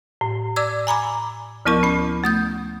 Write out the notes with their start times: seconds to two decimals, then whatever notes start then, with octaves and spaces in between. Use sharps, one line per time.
0.21 A2
0.56 D5 D6 E6 G#6
0.87 G#5 A#5 B5 D6
1.65 D2 F3 B3 E4 A#4 C#6
1.83 C#4 B5
2.24 A3 D#6 G6